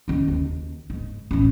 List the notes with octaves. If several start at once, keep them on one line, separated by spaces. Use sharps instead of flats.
D#3 C#4
D#2 D#3
G#2
A1 C#4